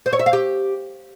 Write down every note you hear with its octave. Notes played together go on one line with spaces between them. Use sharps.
C5
C#5
E5
F5
G4